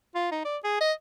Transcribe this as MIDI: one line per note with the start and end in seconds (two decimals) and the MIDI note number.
0.15 0.31 65
0.32 0.40 63
0.45 0.57 74
0.64 0.79 68
0.81 0.92 75